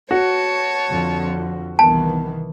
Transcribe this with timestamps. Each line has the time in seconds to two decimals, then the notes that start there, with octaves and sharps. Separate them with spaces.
0.11 F#4 C#5 A5
0.89 F2 D3 F3
1.79 C2 D#3 E3 B3 A5